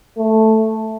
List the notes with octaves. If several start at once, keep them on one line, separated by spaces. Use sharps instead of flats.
A3